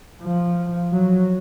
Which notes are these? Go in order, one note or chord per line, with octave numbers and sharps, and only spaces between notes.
F3
F#3